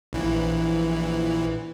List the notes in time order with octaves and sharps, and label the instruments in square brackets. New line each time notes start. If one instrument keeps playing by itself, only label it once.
[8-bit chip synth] A#1 E3